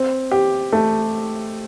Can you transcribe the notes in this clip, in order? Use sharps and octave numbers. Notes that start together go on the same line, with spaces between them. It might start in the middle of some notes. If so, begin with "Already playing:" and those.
Already playing: C4
G4
A3